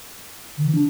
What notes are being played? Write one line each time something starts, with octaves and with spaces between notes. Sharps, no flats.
D3
E3
D4